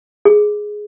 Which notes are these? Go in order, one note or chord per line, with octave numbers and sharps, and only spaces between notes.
G#4